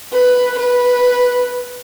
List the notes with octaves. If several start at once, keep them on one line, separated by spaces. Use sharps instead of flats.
B4
B4